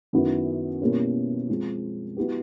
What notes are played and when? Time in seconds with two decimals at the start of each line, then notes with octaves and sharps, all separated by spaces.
0.13 F#2 D#3 F#3 B3 E4
0.81 B2 G3 A#3 C#4 E4
1.49 F3 G#3 C4
2.17 F#3 B3 E4 G4